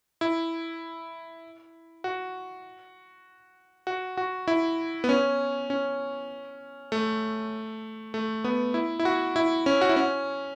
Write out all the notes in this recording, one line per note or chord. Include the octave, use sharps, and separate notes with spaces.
E4
F#4
F#4
F#4
E4
B3
C#4
C#4
A3
A3
B3
E4
E4
F#4
E4
C#4
F#4
E4
C#4